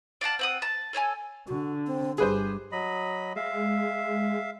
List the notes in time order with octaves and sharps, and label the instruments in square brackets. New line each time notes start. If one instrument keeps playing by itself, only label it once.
[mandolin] D5 F5 F#5 A5
C4 F#5 D#6
A5
A4 C#5 D#5 G#5
[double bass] D3 [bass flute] F#4
[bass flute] C4
[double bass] G1 G3 [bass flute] G4 [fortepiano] G#4 B4 C5
[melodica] F#3 D#5 B5
[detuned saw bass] G#3 [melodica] E5 F5